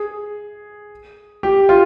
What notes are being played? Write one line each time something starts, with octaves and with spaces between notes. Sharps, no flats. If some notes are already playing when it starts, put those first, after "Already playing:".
Already playing: G#4
G4
F4